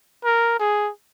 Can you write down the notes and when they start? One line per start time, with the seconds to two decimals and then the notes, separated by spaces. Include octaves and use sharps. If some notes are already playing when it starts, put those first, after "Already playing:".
0.24 A#4
0.59 G#4